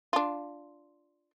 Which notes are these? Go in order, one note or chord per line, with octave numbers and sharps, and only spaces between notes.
D4 F4